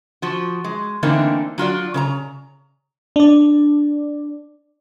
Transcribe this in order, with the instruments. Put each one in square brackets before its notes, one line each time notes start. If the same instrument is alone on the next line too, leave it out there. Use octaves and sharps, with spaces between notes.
[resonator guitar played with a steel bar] F3 F#4
G#3
D3 E3 A3 A#3 C4 D#4
F#3 F4 F#4 D5
C#3 C5 A#5
[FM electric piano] D4 D5